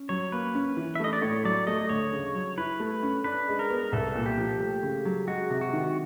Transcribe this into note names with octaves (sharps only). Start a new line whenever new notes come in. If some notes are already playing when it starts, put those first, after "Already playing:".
Already playing: C#4
F#3 C#5
A#3 B4
C#4
E3
E5
A3 D#5
D5
A2 C#5
F#3 D5
A3 D#5
D2 C#5
C#3
F#3
E4 B4
A3
C#4
D4 B4
G#3
A#4
B3
C2 A4
A#2
G4
F3
A3
C#3
F#3
G#3 F#4
C3
F#4
D#3